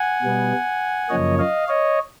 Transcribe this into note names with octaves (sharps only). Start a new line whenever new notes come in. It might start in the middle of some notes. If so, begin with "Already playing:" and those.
Already playing: F#5 G#5
B2 G3 B3
F#2 C#3 F3 A#3 C#5 D#5
D#5 F5
C#5 D#5